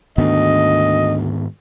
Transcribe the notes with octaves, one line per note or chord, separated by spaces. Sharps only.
D2 G#2 D#3 B3 D#5